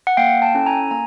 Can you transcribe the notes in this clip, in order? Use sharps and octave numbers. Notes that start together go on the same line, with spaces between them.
F#5
A#3 F5 G5
G5 A5
C#4 E4 A4
G#5 A#5
A#3 G#5 A#5